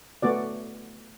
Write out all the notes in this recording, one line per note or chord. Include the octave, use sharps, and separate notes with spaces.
A3 B3 F#4 D5